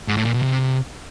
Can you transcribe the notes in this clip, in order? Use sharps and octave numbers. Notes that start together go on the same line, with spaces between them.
G#2
A2
A#2
B2
C3